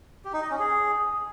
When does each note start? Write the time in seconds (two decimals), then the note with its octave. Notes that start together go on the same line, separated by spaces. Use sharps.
0.25 G4
0.33 D#4
0.42 D#5
0.51 C#4
0.59 G#4